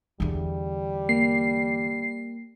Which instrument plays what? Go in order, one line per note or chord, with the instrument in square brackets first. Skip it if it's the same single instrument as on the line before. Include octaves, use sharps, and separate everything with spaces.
[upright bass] E2 D3 [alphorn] G3
[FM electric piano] A#3 [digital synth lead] C7